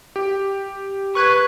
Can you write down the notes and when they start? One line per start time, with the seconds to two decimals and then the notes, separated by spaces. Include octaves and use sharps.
0.16 G4
1.15 B4 C#6 F#6 G#6